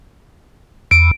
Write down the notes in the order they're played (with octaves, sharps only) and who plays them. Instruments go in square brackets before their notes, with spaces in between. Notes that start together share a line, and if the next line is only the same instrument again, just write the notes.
[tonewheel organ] E2 [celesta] D7